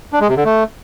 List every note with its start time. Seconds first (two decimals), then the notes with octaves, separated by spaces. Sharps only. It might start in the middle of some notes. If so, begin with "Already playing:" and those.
0.13 D4
0.21 G#3
0.29 C3
0.37 D3
0.45 A3